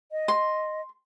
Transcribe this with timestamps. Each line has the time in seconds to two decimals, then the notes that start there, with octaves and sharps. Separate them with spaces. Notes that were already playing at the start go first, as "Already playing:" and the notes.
0.12 D#5
0.28 C6